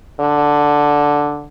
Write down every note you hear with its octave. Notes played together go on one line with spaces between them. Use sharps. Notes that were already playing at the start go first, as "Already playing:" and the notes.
D3